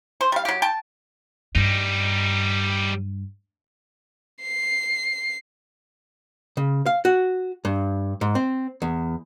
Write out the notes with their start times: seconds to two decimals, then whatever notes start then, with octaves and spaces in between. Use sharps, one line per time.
0.21 C5
0.32 G3 F5
0.45 F#3 G4
0.62 G5 A5
1.55 G2 G3 D#4
4.42 C7
6.57 C#3
6.86 F5
7.05 F#4
7.65 G2
8.21 G#2
8.35 C4
8.82 E2